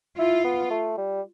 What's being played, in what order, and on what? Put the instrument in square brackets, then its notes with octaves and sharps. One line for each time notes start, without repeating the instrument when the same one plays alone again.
[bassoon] E4 [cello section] F4
[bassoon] B3
A3
G3